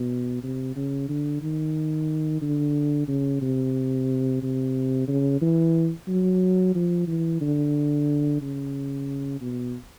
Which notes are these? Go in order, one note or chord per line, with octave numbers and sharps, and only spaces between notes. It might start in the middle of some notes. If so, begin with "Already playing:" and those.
Already playing: B2
C3
C#3
D3
D#3
D3
C#3
C3
C3
C#3
E3
F#3
F3
E3
D3
C#3
B2